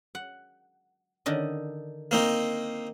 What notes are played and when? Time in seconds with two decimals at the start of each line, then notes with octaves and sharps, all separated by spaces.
0.15 F#5
1.26 D3 D#3 D#5
2.11 A#3 C4 D#4